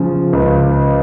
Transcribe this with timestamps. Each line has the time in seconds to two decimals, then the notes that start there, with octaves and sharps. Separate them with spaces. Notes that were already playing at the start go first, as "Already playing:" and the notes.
Already playing: C#3 F3
0.33 C#2